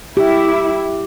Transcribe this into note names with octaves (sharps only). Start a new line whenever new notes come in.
E4 G4